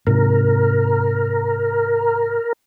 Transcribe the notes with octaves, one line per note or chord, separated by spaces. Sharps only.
G#2 C3 A#4